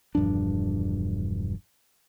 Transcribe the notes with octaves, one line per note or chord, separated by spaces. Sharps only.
E1 G2 F3 D4